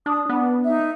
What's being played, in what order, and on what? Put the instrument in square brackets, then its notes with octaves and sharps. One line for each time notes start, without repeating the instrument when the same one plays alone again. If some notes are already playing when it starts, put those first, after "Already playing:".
[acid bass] D4 [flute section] D#6
[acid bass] B3 [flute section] D4
[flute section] D#4 E5